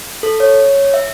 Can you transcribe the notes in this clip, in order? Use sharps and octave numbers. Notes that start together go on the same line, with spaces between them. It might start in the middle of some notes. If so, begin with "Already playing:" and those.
A4
C#5
E5